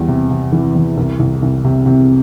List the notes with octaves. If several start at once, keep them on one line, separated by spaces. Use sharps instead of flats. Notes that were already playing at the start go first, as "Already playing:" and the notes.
Already playing: E2 G3
C3
C3
E3
E2
C2
C2
C2
C3
C3